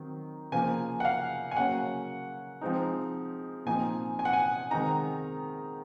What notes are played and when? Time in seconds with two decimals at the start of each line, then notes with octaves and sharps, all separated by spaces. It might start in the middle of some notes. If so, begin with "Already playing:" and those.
Already playing: D#3 F#3 C4 D#4
0.52 C#3 F3 A#3 G#5
1.00 F#5
1.05 F5
1.51 G#5
1.57 C#3 F#3 A#3 C#4 F#5
2.61 F3 G#3 C4 D#4
3.66 A#2 F3 C4 D#4 G#5
4.19 G#5
4.25 F#5
4.33 G#5
4.71 D#3 G#3 C4 D#4 A#5